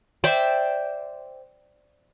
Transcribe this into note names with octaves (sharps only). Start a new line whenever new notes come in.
C5 D5 E5 G5